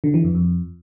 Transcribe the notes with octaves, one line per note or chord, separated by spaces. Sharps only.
D3
E3
F2
F2